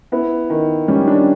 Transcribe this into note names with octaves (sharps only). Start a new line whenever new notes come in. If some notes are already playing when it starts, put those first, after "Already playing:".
B3 E4
D#3
G3 C#4
D4